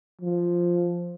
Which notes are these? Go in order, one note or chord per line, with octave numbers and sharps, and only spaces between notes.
F3